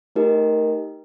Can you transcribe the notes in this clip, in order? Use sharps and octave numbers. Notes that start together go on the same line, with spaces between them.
A3 D#4 G4 A#4 D#5